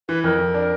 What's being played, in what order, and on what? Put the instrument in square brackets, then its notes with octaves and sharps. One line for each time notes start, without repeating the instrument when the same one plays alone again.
[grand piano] E3 [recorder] B4
[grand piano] F2 [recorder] A#4
[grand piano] F2
D4